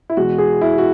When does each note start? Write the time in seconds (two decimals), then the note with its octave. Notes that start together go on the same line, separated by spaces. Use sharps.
0.10 E4
0.17 E2 B2 G#3 F#4
0.38 G#4
0.61 E4
0.78 F#4